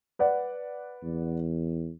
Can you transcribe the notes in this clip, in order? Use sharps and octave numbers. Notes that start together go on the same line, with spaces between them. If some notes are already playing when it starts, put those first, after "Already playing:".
B4 D5 F#5
E2